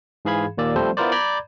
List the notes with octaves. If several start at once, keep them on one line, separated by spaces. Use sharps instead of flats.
G#2 E3 G#4 F5 B5 G#6
D#2 A#2 A#3 D5 E6
F3 G3 A3 C4 A4 C5
B3 E4 F4 A#4 C5 D5
D5 A#5 B5 G6 G#6